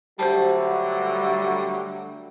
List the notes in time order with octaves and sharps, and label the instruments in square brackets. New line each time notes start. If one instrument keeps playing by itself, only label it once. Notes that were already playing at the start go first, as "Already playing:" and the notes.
[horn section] D3 F#3 A3 [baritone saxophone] G3 [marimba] G4 C5 A5